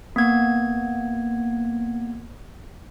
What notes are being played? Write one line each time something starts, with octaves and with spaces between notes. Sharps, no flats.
A#3 B3 G#6